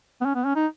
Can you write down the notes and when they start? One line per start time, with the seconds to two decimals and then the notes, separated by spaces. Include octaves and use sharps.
0.21 B3
0.25 C#4
0.35 B3
0.45 C#4
0.56 D#4